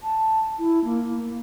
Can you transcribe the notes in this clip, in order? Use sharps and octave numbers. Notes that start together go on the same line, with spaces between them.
A5
E4
A#3